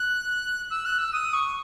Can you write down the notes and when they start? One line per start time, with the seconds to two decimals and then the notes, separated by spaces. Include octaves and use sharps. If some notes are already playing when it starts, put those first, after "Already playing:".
Already playing: F#6
0.71 E6
0.85 F#6
0.98 E6
1.13 D#6
1.33 C#6